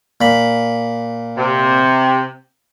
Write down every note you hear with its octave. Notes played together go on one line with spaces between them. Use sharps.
A#2 B5
C3